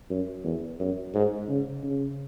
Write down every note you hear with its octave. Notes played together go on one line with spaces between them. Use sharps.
F#2
E2
F#2
G#2
C#3
C#3